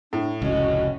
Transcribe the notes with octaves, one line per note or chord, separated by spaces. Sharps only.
A2 D4
F1 C#2 C#4 F#4 D#5